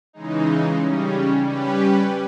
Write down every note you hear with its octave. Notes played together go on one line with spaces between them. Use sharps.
C#3 E3 G#3 D#4
C#3 G3 C#4
G3 C#4 G4 B4